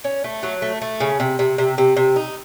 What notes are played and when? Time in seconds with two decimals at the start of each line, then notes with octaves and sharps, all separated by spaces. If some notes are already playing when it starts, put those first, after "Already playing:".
0.04 C#4
0.24 A3
0.43 F#3
0.62 A3
0.81 A3
1.00 C#3
1.20 C3
1.39 C3
1.58 C3
1.78 C3
1.97 C3
2.16 D#4